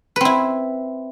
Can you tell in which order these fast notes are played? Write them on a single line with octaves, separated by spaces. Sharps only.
B4 C4 E4